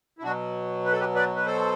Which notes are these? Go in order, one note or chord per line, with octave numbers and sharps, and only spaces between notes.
E4
B2 F#3 D4 F#4
B4
A4
G4 B4
B4 D5
B4
A4 C5